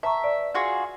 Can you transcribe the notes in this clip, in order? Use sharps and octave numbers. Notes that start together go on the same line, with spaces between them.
E5 A5 A#5 C#6
B4 D5
F4 F#4 G#4